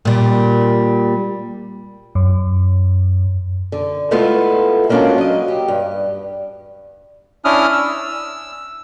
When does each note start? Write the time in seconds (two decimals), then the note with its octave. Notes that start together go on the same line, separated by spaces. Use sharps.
0.05 A#2 G3
2.15 F#2
3.72 D3
4.11 G#3 A3 B3 E4 F4 A4
4.89 G#3 A#3 C#4 D4 F4 F#4
5.18 F#3 D#5
5.48 G4
5.68 G2
7.45 C#4 D4 E4 D#6 F6
7.73 E6